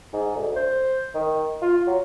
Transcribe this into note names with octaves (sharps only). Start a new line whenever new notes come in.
G#2
D2
C5
D#3
F4
F#3